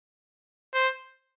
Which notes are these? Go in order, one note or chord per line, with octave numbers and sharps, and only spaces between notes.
C5